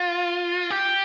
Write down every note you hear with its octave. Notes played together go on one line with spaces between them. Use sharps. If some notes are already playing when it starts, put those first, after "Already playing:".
Already playing: F4
G4